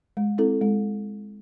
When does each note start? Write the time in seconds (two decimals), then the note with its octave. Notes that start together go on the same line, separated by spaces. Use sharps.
0.17 G#3
0.38 C4 E4 A4
0.61 G#3